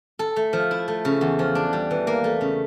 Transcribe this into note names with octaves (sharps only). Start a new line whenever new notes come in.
A4
A3
F3
E4
A3
C#3
E2
F3
D4
G3
E3
A#3
A3
C#3